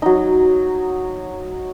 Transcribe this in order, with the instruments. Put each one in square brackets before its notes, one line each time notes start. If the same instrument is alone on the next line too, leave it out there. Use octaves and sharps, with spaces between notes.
[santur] F#3 D#4